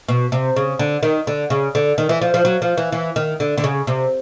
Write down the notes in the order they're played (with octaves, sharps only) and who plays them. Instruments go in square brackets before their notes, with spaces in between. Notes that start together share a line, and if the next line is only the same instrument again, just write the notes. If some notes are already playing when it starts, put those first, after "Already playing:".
[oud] B2
C3
C#3
D3
D#3
D3
C#3
D3
D#3
E3
F3
F3
F#3
F3
E3
E3
D#3
D3
D3
C#3
C3